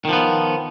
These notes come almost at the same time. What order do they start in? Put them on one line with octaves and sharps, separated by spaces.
D#3 F3 B3